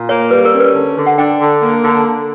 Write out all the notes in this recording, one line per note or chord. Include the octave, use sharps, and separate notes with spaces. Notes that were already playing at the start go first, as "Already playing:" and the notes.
Already playing: A#2
A#3 C#5
G3 B4
A#4
C#4
B4
D3
D3
F#5
D4 G5
D3
A#3
D3
D3